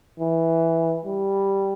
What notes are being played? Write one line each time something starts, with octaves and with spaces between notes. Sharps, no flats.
E3
G3